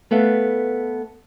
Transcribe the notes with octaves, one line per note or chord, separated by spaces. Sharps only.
A3 B3 A4 B4 F5